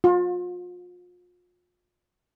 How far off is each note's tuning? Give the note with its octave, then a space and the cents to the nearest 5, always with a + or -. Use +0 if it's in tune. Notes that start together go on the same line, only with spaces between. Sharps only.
F4 +35